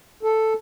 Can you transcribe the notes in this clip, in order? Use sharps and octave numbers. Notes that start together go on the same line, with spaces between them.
A4